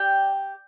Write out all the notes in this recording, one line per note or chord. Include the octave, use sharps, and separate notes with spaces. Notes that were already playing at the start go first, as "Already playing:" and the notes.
Already playing: G4 D5 G5